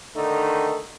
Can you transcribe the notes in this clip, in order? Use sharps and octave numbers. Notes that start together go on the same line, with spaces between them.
D3 D#3 A3 D#4